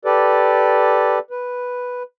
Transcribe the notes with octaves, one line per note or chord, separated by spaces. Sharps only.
G4 A4 B4 D5
B4